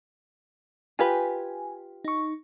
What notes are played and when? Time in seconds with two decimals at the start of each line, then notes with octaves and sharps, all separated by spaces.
0.99 F4 G4 B4 G#5
2.05 D#4 C#6